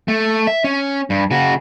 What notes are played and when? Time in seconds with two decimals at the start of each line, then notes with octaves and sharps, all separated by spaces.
0.08 A3
0.47 E5
0.64 C#4
1.10 G2
1.31 C#3 F#4